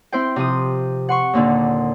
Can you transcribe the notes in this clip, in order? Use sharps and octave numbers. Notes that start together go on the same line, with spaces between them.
C4 E4 C5 G5
C3 F3 D#6
F#5 C6 C#6
D#2 A#2 D3